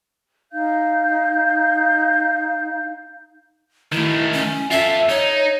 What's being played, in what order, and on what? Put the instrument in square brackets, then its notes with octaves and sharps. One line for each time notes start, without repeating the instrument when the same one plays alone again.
[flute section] D#4 F5 G6
[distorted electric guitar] D#3 A3 [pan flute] E4
[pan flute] C#4
[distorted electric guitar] F4 A4 [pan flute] E5
[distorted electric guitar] D#4 [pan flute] C#5